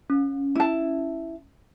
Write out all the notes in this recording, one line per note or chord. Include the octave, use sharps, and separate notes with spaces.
C#4
E4 A5